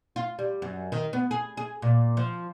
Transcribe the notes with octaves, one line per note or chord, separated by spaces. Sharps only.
F4
G3
F#2
D#3
B3
G#4
G#4
A#2
F3